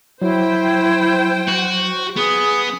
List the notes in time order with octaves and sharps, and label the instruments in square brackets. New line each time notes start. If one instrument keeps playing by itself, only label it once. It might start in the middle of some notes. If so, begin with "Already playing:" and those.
[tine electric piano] F#3 [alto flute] E4 [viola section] C5 G5
[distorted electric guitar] F#4
[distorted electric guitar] B3 [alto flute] G#4